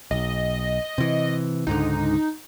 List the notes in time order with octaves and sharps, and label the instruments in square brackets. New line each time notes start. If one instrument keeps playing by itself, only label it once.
[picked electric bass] B1 [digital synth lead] D#5
[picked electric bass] C3 E3
[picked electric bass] C#2 G#2 D3 [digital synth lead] D#4